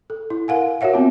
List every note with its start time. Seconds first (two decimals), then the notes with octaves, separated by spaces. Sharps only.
0.10 A4
0.30 E4
0.48 A#4 F5 F#5 G#5
0.81 F#4 A#4 C#5 E5 F#5
0.94 B3 C4 F4